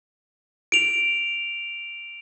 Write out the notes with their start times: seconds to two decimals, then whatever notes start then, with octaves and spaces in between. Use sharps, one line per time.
0.72 D7 F7